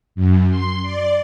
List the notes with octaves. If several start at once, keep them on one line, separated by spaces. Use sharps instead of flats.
F#2
C6
D5